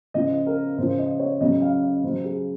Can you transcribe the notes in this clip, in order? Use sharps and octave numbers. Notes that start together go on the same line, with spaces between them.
C#3 F3 D#5
A#4
C#3 F3 C5
D#5
C#5
C#3 F#3 D#5
F5
D#5
C#3 F#3 C5
G#4